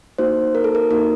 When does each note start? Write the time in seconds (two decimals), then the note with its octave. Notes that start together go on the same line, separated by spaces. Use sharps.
0.18 A#3 D#4 F#4 C5
0.55 A#4
0.64 A4
0.75 A#4
0.90 A#3 D#4 F#4 A#4